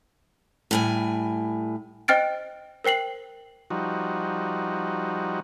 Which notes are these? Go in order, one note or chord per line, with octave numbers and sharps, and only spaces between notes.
A2 G3 G#5
C5 D#5 G5 F6 A6 D7
A#4 C5 G5 C7 F#7
F3 G3 D#4 F#4